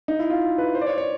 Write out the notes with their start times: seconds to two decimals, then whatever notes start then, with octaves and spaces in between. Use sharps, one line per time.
0.08 D#4
0.19 E4
0.30 F4
0.58 B4
0.75 C5
0.81 D5
0.86 C#5
0.98 C#5